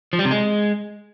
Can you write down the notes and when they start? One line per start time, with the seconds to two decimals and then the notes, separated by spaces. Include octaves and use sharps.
0.13 F3
0.19 G3
0.25 C3
0.31 G#3